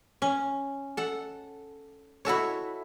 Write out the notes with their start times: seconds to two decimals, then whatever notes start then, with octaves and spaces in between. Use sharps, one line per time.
0.22 C#4
0.97 A4 F#5
2.25 E4 F#4 A4 C#5